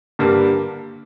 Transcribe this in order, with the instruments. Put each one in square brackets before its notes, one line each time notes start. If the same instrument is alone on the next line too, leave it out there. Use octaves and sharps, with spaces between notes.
[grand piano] G2 D3 G3 A#3